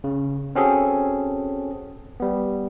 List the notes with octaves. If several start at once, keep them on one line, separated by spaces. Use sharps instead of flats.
C#3
C4 C#4 F#4 G#4 A4
G3 B3